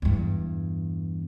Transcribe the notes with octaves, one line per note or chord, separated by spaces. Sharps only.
E2 G2